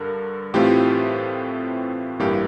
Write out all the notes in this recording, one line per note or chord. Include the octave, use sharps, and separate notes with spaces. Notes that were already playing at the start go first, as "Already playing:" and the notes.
Already playing: G2 D3 A#4
A2 E3 A3 C4 F4 G4
A1 G2 E3 A#3 G4